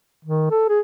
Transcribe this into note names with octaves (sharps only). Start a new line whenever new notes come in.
D#3
A4
G#4